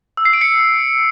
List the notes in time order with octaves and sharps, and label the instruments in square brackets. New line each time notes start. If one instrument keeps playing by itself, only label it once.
[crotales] E6
C7
D7
C#7